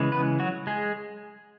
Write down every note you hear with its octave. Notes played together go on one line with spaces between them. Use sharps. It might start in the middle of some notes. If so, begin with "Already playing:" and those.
Already playing: C#3 E3 G#3
B3 B4
F#3 F#4
G#3 G#4